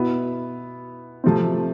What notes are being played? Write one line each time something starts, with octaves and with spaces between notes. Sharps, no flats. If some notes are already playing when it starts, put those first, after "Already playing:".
Already playing: B2 B3 E4
C3 F3 A3 C4